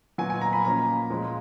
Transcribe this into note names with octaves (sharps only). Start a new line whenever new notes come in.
A#2 F#3 B3 G#5
G#5
A#5
B5
A#2 F3 A#3 C#4 A#5
A#2 F3 G#3